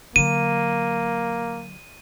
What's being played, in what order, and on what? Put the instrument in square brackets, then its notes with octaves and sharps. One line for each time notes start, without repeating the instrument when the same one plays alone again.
[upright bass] D3 F#3 [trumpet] A#3 [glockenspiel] D#7